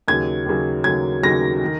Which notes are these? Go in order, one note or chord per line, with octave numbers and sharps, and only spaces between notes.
D#2 C#3 F#3 G#6
D#2 C#3 F#3
D#2 C#3 F#3 G#6
D#2 C#3 F#3 A#6
D#3